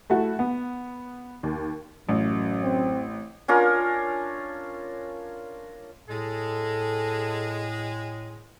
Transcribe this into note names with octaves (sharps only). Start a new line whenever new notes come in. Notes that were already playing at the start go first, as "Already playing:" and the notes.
A3 E4 F#4
B3
D#2
A1 F#2
C4
C#4 D4 F4 A#4
A2 G#3 A4